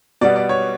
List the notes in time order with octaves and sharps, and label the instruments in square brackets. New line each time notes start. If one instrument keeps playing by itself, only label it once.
[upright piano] B2 G3 B3 D5
D5
C#5